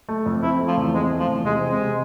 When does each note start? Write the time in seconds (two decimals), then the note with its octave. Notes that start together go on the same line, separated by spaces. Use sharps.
0.09 A3
0.26 F2
0.42 C4 E4
0.60 A3
0.68 F3
0.77 E2
0.94 G#3 C4
1.11 A3
1.19 F3
1.28 E2
1.44 C3 G#3
1.61 C4
1.70 G#3
1.78 C3